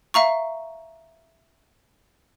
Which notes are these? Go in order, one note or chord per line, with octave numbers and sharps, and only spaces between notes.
E5 F5 A#5 C#6